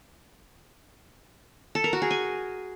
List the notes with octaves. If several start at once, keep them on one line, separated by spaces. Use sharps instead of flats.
A4
A#4
F#4
G#4
G#5